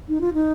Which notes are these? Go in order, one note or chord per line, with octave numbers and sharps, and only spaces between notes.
D#4
F4
D#4